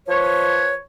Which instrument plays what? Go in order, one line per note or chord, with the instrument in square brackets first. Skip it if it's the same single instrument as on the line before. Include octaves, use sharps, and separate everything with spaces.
[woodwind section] F3 B4 C#5